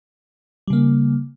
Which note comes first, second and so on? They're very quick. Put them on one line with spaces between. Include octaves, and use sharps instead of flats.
G3 C#3 A#3